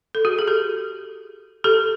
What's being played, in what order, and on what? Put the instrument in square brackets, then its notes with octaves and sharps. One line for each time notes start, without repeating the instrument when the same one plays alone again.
[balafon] A4
F#4 G#4
G#4
G4 A4
G4 A4